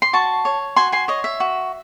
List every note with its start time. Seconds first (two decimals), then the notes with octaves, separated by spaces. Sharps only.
0.02 C6
0.13 F#4 A5 C#6
0.45 C#5
0.76 F#4 G#5 C6
0.92 G#5 C6
1.08 C#5 D#5
1.24 E5
1.40 F#4